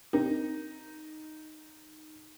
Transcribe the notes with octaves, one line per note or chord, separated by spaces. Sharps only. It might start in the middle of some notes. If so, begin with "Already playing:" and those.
C4 D#4 G4 A#4